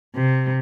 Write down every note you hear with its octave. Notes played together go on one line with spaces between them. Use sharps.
C3